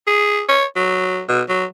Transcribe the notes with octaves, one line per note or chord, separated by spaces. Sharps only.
G#4
C#5
F#3
B2
F#3